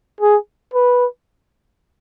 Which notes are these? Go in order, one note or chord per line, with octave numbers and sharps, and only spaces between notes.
G#4
B4